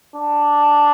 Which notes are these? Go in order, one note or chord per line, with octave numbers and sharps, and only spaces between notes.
D4